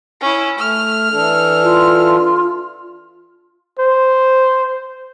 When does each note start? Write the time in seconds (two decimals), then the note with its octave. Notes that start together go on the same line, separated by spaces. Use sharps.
0.21 C#4 E4
0.58 A3 F6
1.12 E3 D4 A4
1.62 F4
3.79 C5